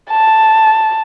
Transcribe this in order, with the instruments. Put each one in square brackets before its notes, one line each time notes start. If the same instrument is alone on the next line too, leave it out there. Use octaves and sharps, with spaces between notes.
[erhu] A5